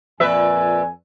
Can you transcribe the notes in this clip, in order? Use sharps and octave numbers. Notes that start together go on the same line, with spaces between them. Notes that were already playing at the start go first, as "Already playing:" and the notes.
F2 A#2 B4 E5 G#5